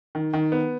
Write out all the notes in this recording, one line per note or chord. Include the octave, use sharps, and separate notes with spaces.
D#3
D#3
B3